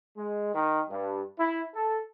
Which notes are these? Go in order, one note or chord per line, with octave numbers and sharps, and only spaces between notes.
G#3
D#3
G2
E4
A4